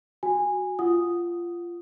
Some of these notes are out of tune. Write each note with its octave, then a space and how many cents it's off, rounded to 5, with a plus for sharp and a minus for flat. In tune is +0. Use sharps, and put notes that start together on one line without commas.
F#4 +0 G#5 -15
F4 -15 F#5 +0 D#6 +0